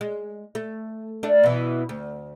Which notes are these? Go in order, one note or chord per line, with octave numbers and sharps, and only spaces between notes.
G#3
A3
A3 D4
B2 E3
D2